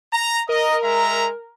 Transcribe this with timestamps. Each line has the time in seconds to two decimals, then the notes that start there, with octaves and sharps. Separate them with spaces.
0.13 A#5
0.49 A#4 D#5
0.83 G#3 E5 A#5